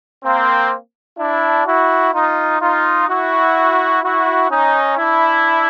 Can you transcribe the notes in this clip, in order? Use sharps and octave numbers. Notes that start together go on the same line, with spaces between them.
A#3 C4
D4 E4
E4 F#4
D#4 F4
D#4 F4
E4 F#4
E4 F#4
C#4 D#4
D4 E4